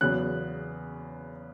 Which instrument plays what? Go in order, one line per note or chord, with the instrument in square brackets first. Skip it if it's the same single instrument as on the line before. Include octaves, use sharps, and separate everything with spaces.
[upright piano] E2 C#3 F#3 B3 F#6